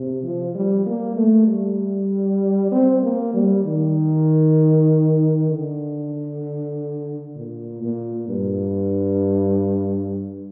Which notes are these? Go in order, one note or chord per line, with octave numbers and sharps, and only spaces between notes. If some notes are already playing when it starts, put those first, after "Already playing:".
Already playing: C3
F3
G3
A#3
A3
G3
C4
A#3
G3
D#3
D3
A#2
A#2
G2